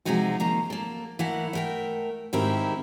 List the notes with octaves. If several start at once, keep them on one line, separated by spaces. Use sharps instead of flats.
C3 F3 G#3 C4 D#4 F#4
D#3 F3 A#3 A#5
A#3 A4
E3 A3 E4 A#4 F#5
A3 A#4 G5
G#2 D#3 C4 E4 G4 A#4